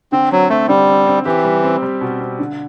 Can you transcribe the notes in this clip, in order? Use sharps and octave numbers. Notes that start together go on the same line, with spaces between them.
D3 C4
F#3 C4
A3 C4
D3 G3
C4
C4
E3 G4
G3
C4
G3
B2
C4
D3